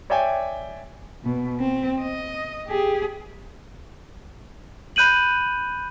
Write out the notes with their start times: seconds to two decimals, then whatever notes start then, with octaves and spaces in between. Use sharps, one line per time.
0.10 C#5 D5 E5 G5 G#5
1.24 B2
1.60 C4
2.01 D#5
2.68 G4 G#4
4.96 B5 F#6 G6 D#7 F#7